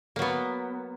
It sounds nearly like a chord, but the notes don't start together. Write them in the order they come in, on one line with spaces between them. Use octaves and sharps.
A#3 F#3 B3